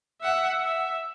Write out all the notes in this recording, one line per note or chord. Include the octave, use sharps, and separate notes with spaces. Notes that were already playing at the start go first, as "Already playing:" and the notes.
E5 F#5
E5